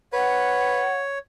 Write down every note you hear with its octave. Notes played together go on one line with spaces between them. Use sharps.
B4 C#5 F#5